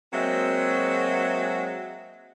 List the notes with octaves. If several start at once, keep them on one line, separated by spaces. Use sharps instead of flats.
F#3 G#3 A#3 C4 E5